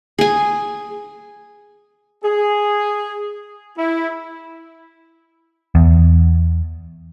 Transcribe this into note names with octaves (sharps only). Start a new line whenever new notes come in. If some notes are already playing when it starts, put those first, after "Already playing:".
G#4 G#5
G#4
E4
E2